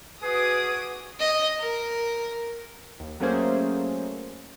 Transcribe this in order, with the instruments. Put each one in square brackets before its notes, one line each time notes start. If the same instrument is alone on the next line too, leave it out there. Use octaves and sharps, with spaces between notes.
[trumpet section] C#4 G#4 [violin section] F#4 D6 D#6 [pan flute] B4
[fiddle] D#5
A#4
[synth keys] D#2
F#3 A3 A#3 C#4 G#4 C5